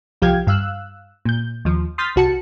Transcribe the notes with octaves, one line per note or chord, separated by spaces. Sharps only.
C2 F3 G4 F5 G5 G#6
G2 F5 E6 F#6
A#2 G6
D#2 F3
C6 D#6 F6 G6 A6 B6
C2 F#4 A5 C#7